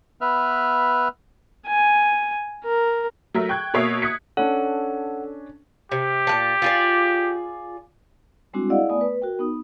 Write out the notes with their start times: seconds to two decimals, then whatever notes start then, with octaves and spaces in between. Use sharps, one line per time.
0.21 B3 B4 E5 F6
1.67 G#5
2.65 A#4
3.34 F#3 A3 A#4 E5
3.49 G5 C#6 F#6 G#6
3.74 B2 A#3 C#5 E5 D#6 C7
4.02 D#6 F#6 G#6 B6 C#7
4.37 C#4 D4 A4 F#5
5.92 C3 G4
6.27 A#2 G#3 A5
6.62 F4 G#4 D5
8.53 G3 G#3 C4 D4 E4 F#4
8.70 E4 G#4 D5 D#5 F5 F#5
8.89 A3 B3 D5 G#5 D#6
9.01 B4
9.22 F#4 A#4 G5
9.39 B3 D#4 D#6